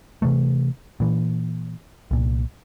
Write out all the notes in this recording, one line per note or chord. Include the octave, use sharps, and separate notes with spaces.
C3 E3 A3
A#2 E3
C2 A#2